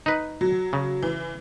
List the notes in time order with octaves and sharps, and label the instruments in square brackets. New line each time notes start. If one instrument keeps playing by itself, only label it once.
[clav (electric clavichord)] D#4 B4
[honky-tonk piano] F#3
[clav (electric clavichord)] C#3
[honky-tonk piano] E3